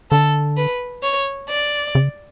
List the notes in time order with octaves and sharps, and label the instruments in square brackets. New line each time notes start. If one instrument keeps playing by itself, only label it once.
[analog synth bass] D3 [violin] A4
[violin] B4
C#5
D5
[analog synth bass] C#3